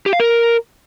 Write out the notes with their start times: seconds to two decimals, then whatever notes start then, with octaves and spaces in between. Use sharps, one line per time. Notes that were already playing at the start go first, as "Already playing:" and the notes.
0.06 G4
0.13 F5
0.20 A#4